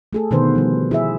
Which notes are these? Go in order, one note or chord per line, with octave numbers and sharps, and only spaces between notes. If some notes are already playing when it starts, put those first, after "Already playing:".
A3 G#4 A4
B2 D3 D#3 B3 B4 C5
F3 G3
E4 G#4 E5